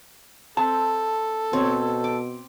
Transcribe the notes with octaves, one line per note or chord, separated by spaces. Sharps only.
C4 A4 A5
B2 C4 C#5
D6